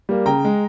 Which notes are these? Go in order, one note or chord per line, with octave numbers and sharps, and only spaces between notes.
G3 A#3
C#3 G5 A#5
G#3